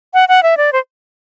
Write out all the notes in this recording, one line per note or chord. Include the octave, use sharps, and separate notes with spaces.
F#5
F#5
E5
D5
C5